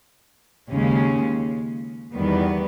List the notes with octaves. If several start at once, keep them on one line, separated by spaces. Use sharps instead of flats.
D#2 C#3 G#3 C#4
E2 D#3 G3 B3